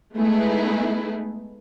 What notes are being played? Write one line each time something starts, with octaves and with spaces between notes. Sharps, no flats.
G#3 A3 B3 D#4 E4 G#4